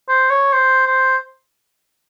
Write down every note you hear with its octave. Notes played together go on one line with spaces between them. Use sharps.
C5
C#5
C5
C5